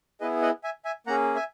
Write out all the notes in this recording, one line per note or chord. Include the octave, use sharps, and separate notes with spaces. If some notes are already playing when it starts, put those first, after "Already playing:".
B3 E4 G#4 B4 D#5
D#5 F#5
E5 G#5
E5 G#5
A#3 C#4 G#4 F#5 A#5
E5 G#5